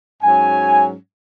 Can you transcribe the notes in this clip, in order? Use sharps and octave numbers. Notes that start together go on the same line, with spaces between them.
G#2 F#3 C#4 G#5